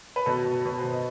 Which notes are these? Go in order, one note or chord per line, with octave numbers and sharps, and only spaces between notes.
B4
B2 A4
B2
B2 B4
C5
B2
D#5